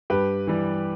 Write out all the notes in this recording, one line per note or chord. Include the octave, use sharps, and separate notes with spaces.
G2 G4 B4
E3 G3